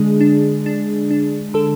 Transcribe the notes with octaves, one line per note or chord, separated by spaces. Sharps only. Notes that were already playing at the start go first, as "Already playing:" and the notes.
Already playing: D3 G#3 D4 G#4
D4
D4
D4
D3 A4